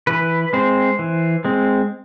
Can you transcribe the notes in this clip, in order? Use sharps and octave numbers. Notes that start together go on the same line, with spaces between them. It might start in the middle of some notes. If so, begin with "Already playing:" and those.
E3 B4
G#3 C4 C5
E3
G#3 C4